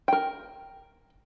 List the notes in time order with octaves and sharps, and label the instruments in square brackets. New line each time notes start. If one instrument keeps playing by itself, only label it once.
[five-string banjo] A#4 G5